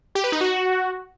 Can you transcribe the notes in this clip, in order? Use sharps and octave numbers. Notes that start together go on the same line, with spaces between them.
G4
B4
D#4
F#4